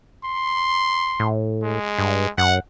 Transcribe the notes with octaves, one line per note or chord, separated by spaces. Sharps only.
C6
A2
G#3
G2
F#2 F#5